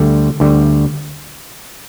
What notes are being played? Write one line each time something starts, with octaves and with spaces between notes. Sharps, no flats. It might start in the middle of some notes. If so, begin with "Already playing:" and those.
Already playing: D2 D3 G3
D2 D3 G3